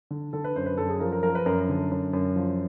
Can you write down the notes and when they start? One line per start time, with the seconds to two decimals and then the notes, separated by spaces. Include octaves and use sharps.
0.11 D3
0.33 D3 A4
0.44 B4
0.56 F#2 C5
0.66 B4
0.78 F#2 A4
0.89 G#4
1.00 F3 A#4
1.13 A#4
1.23 F3 A#4
1.35 B4
1.46 F#2 A#4
1.69 D3
1.91 F#2
2.13 F#2
2.36 F3